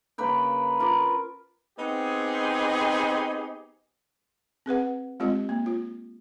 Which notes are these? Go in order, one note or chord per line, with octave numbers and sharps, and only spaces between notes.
C#3 A#3 B4 G5
F4 A#4 B4 D6
B3 C4 D#4 G4 G#4
C4 G#4 B4 F#5
G#3 C4 F4 G4 D#5
A#3
F4